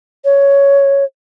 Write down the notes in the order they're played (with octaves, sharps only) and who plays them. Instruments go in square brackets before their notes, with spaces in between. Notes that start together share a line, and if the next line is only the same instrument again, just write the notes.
[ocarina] C#5